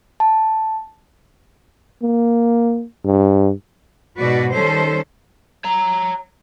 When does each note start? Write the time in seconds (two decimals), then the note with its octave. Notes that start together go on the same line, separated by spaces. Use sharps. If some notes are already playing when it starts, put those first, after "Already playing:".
0.20 A5
2.03 A#3
3.05 G2
4.19 G#2 B2 F#4 B4 D5
4.53 D#3 G3 C#4 A4 C5
5.64 C#5 A#5